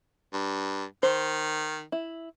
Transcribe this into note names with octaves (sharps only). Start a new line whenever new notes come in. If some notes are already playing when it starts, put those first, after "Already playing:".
G2
D#3 C5
E4